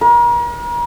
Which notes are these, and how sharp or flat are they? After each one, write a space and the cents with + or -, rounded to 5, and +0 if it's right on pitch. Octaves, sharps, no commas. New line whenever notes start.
A#4 +40